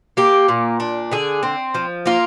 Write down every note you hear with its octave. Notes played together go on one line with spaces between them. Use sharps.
A#3 G4
A#2
D4
D3 G#4
C4
F3
A#3 F4